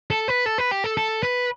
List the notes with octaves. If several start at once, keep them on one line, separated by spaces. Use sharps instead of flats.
A4
B4
A4
B4
G4
A4
A4
B4